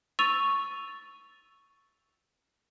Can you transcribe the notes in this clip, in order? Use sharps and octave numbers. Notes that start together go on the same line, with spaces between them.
C#6 E6 A6 D#7 F7